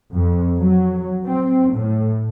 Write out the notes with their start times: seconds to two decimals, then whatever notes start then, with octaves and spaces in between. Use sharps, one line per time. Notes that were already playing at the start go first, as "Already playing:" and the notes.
0.13 F2
0.58 F#3
1.25 C4
1.73 A2